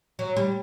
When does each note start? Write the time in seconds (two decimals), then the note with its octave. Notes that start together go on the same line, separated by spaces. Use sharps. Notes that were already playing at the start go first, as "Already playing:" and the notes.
0.19 F#3
0.36 G3